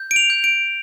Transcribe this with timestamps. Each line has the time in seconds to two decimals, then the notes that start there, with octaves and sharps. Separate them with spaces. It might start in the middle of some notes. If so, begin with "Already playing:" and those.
Already playing: G6
0.11 D7
0.16 F7
0.30 G6
0.44 D7